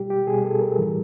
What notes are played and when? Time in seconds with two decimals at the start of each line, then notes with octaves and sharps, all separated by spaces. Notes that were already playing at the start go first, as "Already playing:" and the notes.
Already playing: B2 G3 G4
0.10 G4
0.27 B2 G3 G#4
0.45 A4
0.61 A#4
0.78 A2 E3 G3